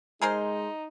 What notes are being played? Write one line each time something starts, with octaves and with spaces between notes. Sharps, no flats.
G#3 D#4 G#4 A#4 C5